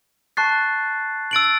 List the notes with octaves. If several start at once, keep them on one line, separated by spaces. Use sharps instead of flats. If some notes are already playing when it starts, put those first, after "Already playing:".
A5 C#6 F#6 A6 C7
E6 A6 D7 F#7